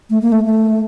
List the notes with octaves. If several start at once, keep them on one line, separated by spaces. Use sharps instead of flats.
A3
A#3
A3
A3